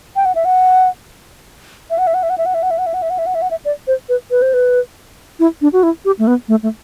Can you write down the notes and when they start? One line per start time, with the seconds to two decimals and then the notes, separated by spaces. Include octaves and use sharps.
0.16 G5
0.25 F#5
0.35 E5
0.45 F#5
1.90 E5
1.98 F#5
2.07 E5
2.14 F#5
2.23 E5
2.30 F#5
2.38 E5
2.46 F#5
2.54 E5
2.63 F#5
2.71 E5
2.78 F#5
2.86 E5
2.94 F#5
3.02 E5
3.10 F#5
3.19 E5
3.26 F#5
3.35 E5
3.42 F#5
3.51 E5
3.65 D5
3.87 C5
4.09 B4
4.31 B4
4.42 C5
4.54 B4
5.40 E4
5.62 D4
5.73 F#4
5.83 E4
6.05 G4
6.19 A3
6.27 B3
6.48 A3
6.63 A3